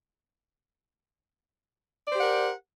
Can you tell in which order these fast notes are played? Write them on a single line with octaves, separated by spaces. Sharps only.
D5 C5 G4 F#5 A#4